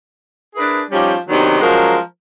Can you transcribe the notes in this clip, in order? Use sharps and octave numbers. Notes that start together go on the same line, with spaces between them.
D4 E4 G#4 A#4 B4
F3 G3 C#4 D#4 G4
C3 D#3 F#3 B3 D4 D#4
F3 F#3 G#3 C#4 A#4